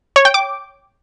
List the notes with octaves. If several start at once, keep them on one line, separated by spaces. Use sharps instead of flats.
C#5
G5
D6